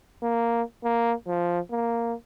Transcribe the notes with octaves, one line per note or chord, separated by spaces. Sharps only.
A#3
A#3
F3
A#3